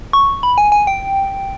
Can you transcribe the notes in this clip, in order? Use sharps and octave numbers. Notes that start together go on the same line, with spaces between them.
C#6
B5
G#5
G#5
G5